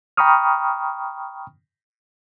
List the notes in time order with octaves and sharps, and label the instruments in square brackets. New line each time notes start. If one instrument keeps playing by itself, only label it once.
[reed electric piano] G5 A#5 B5 C#6 D#6 F6